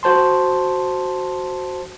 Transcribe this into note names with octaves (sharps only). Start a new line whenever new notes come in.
F#4 C5 A5 C6